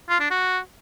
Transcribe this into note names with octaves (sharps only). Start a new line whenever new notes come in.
F4
D4
F#4